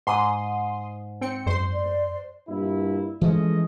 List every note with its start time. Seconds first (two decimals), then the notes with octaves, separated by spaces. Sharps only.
0.07 G#2 C6 D#6
1.21 C4 G5 C#7
1.47 F#2 C5 C6
1.73 D5
2.48 G2 A#2 E4
3.21 E3 F3 G#3 A3 C#4 D#5